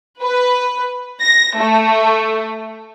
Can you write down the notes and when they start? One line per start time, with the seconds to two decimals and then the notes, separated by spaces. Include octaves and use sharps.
0.22 B4
1.21 A#6
1.59 A3